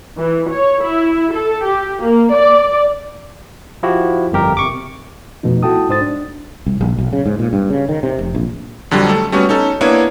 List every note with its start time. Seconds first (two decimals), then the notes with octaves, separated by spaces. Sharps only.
0.18 E3
0.51 C#5
0.82 E4
1.32 A4
1.65 G4
2.03 A#3
2.33 D5
3.83 F3 E4 F#4 G4
4.32 G1 F2 G4 A#4
4.57 C3 C#6 D6
5.43 F2 B2 F3 A3 D#4
5.63 E4 F#4 A4 G5 A5 D#6
5.89 G#2 D#4 C5 D#6 A6
6.01 D4
6.66 C2
6.81 A#1
6.98 B1
7.13 C#3
7.26 G#2
7.39 A#2
7.53 G2
7.70 C#3
7.89 D#3
8.03 C3
8.19 F1
8.35 A#1
8.91 F2 D3 F#3 G3
9.09 A3 A4
9.32 G3 A3 B3 C#4 F#4
9.49 C#4 D#4 A4
9.81 A#3 B3 D4 E4 C#5